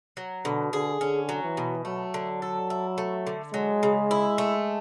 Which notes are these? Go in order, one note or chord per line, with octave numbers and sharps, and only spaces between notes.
F#3
B2 D3
D3 G#4
D3 C#4
F#3
E3
B2
F#3 A3
D3
A4
E4
A3
D3
F#3 G#3
C#3
E4
A3